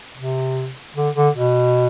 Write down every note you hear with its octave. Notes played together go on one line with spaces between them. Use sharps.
C3
D3
D3
B2